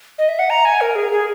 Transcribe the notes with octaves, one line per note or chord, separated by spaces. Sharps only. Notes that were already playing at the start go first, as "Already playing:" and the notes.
D#5
E5
F#5
A#5
G#5
A#4
G#4
G#4